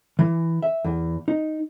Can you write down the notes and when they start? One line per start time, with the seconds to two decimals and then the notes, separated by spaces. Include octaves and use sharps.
0.19 E3
0.62 E5
0.84 E2
1.28 D#4